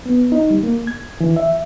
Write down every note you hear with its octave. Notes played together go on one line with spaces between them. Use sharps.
B3
D#4
G3
A#3
G#6
E3
E5